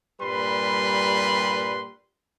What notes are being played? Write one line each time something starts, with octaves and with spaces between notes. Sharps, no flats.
G2 A#2 G3 B4 C6